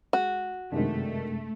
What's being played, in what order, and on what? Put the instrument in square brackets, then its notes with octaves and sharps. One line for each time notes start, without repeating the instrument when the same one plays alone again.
[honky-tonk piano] G#3 [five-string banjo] F#4
[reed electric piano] F#2 C3 G#3 [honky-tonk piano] D#3 D4 [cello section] A3